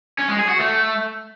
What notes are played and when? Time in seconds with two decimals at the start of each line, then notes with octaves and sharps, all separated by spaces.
0.19 C#4
0.29 G#3
0.39 G#4
0.49 F#4
0.59 A3